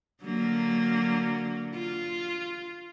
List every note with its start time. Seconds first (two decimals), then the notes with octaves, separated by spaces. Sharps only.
0.22 D3 F#3 A#3
1.75 F4